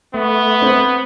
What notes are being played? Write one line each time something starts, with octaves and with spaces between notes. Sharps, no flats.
A3 B3
C4